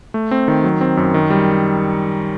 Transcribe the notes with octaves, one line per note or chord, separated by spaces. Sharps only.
A3
C4
D#3
F#3
C4
F#2
D#3
G3